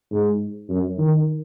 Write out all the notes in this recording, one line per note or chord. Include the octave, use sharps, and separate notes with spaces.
G#2
F#2
D#3